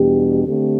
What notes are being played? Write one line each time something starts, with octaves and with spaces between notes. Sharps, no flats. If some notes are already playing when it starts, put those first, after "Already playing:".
Already playing: E2 B2 G3 D4 G4
D3 A3 C4 G4